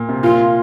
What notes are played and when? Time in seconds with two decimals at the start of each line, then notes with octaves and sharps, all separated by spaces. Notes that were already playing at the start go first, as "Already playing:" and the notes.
Already playing: A#2
0.09 C3
0.23 A#2 F4